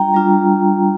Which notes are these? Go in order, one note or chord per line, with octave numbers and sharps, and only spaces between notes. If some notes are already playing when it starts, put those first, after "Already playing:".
Already playing: G3 D4 F4 G5 A#5
G3 D4 F4